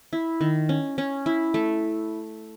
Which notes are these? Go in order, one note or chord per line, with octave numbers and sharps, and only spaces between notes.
E4
D#3
C#4
C#4
E4
A3